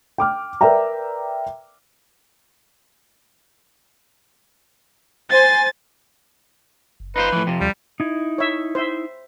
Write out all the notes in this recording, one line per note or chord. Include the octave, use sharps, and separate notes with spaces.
G5 D6 F6
A#4 B4 D5 E5 G5 A#5
C5 G#5 A6
F#1
D#4 F4 B4 C5
A2 E3 F3
F2 C3
D#2 G3
D#4 E4
C#5 E5
C5 E5